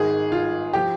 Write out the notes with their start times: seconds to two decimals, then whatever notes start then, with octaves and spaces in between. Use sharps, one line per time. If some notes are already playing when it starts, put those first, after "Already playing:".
Already playing: G#1 G#2 D#3 G#4
0.32 F4
0.73 F3 G4